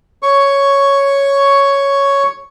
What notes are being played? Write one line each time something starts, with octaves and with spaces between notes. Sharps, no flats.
C#5 C#6